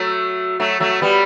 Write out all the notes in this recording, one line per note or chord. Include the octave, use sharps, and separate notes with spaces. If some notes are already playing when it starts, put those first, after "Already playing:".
Already playing: F#3 A3
F#3 A3
F#3 A3
G3 B3